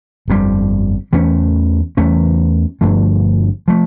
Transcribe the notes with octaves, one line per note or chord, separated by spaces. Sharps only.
G1 F2 C#3 G3
E2 E3 A3 C#4
E2 E3 A3 C#4
G1 G2 F3 A3
F3 A3